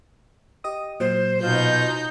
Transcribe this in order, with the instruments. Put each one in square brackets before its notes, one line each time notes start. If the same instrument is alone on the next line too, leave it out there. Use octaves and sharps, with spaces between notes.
[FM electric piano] G4 D#5 D#6
[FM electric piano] A#2 F#3 [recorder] C5
[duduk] B2 [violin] D#4 G6 [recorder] F4